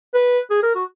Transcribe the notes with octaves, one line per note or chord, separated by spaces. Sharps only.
B4
G#4
A#4
F#4